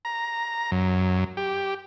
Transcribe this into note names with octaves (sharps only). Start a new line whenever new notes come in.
A#5
F#2
G4